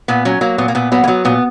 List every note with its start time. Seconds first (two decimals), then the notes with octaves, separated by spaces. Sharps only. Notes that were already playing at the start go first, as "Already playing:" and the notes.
0.08 A#2 B3
0.25 F#3 C#4
0.41 F#3 A#3
0.58 A#2 B3
0.68 A#3
0.75 A#2 B3
0.92 F#3 B3
1.04 A#3
1.07 F#3 B3
1.25 A#2 B3